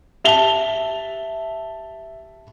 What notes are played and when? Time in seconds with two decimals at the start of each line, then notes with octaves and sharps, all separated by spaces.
0.24 G4 E5 A5 F7 G7